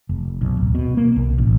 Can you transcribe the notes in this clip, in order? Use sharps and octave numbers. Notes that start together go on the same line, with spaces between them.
F1
B1
D1
B2
A#3
B1
A1